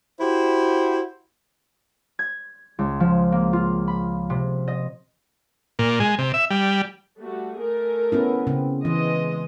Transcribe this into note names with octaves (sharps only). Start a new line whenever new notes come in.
E4 F#4 G4 C5
G#6
C#2
F3
A#3
F4
B5
C3
D#5
A#2
G#3
C3
E5
G3
G3 A3 F#4
A3 G#4 A#4
B3 C#4 E4
C#3 C4
E3 G#3 D#5